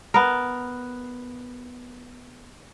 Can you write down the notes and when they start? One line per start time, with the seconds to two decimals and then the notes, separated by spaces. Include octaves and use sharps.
0.14 B3 A#4